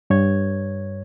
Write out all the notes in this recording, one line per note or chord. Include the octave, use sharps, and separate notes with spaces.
G2 C#5 G#6